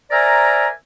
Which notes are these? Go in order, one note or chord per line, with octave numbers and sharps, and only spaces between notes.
A#4 C5 D5 E5 G#5 A#5